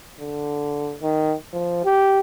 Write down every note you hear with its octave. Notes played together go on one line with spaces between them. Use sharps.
D3
D#3
F3
G4